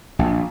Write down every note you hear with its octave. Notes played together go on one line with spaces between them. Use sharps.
A#1